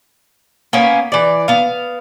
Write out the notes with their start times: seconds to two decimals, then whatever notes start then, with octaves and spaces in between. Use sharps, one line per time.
0.73 A#3 B3 C#4
1.12 E3 D5
1.48 B3 F5